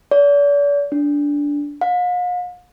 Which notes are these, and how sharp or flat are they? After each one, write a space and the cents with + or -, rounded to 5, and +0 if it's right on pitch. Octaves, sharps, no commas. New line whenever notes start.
D5 -40
D4 -15
F5 +45